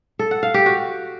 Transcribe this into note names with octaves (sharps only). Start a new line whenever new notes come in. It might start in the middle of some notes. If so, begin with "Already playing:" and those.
A4
F#5
F5
G4
F#4